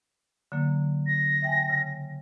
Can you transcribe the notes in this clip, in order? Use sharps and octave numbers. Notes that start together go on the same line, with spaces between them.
D3 F#3 A#3
A#6
E5 G5 G#5
C#3